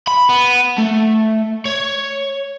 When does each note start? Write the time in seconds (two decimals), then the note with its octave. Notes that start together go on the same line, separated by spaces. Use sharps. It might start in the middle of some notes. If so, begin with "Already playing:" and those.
0.07 B5
0.29 B3
0.78 A3
1.65 C#5